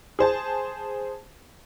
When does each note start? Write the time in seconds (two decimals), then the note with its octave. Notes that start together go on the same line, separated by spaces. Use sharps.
0.19 G#4 C5 A5